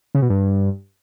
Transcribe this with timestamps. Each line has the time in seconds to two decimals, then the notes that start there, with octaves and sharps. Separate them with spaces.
0.15 C#3
0.22 B2
0.30 G2